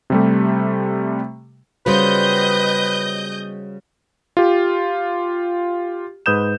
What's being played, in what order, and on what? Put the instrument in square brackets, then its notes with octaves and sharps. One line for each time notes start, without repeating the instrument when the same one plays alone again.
[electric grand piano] C3 G3 A3
[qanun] C#3 B3 C5 [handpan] G3 F#4 [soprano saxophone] B4 [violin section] D#5 G6
[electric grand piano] F4 G4
G#2 B4 D#6 G6 E7